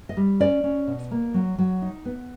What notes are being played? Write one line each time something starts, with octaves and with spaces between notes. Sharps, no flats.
D#5
G3
C#4 D5
C#4
B2
A#3
F#3
F#3
D#4
B3